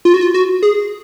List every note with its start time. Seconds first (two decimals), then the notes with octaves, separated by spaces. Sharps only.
0.05 F4
0.14 F#4
0.21 F4
0.34 F#4
0.63 G#4